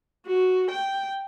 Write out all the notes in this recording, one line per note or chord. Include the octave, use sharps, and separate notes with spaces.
F#4
G5